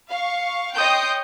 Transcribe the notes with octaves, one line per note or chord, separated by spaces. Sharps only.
F5 C#6
C#5 D#5 G5 C6 D#6 G6